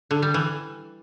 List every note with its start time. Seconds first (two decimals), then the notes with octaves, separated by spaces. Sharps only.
0.11 D3
0.22 G3
0.34 E3